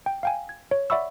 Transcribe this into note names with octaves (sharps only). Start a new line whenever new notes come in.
G5
F5 G5 G#5
G#6
C#5
D5 E5 F#5 B5 C#6 E6